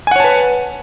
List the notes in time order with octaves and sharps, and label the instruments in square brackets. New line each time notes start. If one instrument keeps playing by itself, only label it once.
[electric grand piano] G#5
F#5
C#5
A5
B4